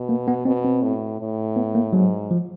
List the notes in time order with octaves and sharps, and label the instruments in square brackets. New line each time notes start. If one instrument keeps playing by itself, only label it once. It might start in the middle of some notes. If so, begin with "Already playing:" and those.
Already playing: [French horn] B2
[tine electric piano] A#3
B3
[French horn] B2 [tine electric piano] C4
[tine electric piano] C4
[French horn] A2
A2
[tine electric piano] B3
A#3
[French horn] G#2 [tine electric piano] F#3
[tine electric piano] F3